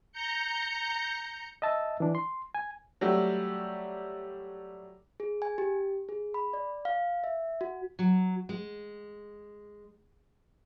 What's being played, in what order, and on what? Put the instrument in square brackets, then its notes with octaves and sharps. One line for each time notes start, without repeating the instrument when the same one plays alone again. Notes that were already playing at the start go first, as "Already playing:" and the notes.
[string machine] A#5 G6 C#7
[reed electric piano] D#5 E5 A5 D#6 E6
E3 D4
C6
G#5
[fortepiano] F#3 G3 A3
[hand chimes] G#4
G#5
G4
G#4
B5
D5
F5
E5
F#4
[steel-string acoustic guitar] F#3
G#3